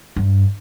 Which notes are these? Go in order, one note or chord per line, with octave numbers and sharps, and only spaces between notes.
G2